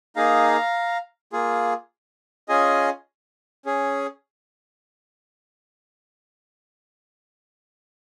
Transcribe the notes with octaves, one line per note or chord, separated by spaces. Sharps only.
A#3 D#4 G#4 F5 A#5
A#3 F4 G#4
C#4 F4 G#4 D#5 G#5
C#4 G#4